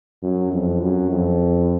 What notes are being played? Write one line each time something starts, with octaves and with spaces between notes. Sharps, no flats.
F#2
F2
F#2
F2